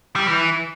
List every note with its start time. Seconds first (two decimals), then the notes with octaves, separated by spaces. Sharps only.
0.16 G3
0.27 E3